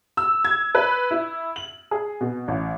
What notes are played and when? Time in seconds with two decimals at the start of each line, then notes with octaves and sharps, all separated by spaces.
0.17 E6
0.45 G#6
0.75 B4
1.11 E4
1.56 F#7
1.91 G#4
2.21 B2
2.48 A1